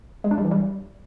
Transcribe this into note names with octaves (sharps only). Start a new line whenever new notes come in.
G#3
D4
G3
E3
G3